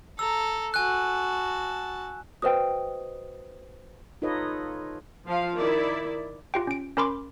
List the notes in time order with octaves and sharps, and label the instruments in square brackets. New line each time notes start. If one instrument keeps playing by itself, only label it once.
[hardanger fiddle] A4 A#5 [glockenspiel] E6
[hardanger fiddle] F#4 A5 [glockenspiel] G#5 F#6
[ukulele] F#4 D#5 G5 [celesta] B4 C5 D#6
[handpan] D#4 F4 A4 B4 C#5 D#5
[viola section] F3 F5
D#3 E4 D5
[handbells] F4 G4 G5
C#4 D7
C#4 A#4 B5 C6 D6